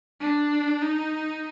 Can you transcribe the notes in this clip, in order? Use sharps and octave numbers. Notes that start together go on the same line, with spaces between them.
D4
D#4